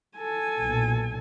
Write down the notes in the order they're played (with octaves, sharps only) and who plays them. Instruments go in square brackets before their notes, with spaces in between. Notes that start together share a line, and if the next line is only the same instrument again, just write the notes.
[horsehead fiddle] A4 G#5
[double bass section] B1 A#2